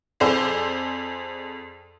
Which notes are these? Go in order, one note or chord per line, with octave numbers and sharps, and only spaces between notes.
F2 G#4 C5 D5 E6